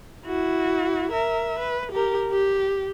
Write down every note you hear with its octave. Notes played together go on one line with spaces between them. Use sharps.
E4 F#4
A#4 E5
B4
G4 A#4
G4